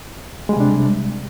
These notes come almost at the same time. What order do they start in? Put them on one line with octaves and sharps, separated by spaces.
G#3 G3 C3 D4